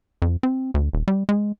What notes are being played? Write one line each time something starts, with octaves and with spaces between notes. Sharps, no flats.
F2
C4
D2
D#1
G3
G#3